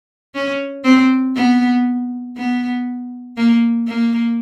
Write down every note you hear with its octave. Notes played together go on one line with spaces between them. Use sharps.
C#4
C4
B3
B3
A#3
A#3